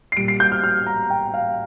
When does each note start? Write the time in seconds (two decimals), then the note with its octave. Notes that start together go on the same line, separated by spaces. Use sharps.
0.12 C7
0.17 A#2 G3 D7
0.28 C7
0.40 G6
0.52 F6
0.64 F6
0.87 A#5
1.10 G5
1.34 F5